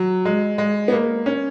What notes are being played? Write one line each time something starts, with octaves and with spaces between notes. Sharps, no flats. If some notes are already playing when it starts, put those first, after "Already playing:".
Already playing: F#3
G#3
G#3
B3
A#3
C#4